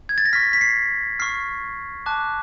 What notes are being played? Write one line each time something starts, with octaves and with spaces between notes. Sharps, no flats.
G#6
A6
A#6
C#6 F6 B6
B6
C7
C#6 F6 C7
A5 D6 F#6